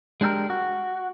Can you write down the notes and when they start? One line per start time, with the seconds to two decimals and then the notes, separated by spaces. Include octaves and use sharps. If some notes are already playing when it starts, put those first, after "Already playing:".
0.21 G#3 D4 G4 A4 A#4
0.50 F#4